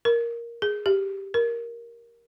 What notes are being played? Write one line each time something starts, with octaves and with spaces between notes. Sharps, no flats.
A#4
G#4
G4
A#4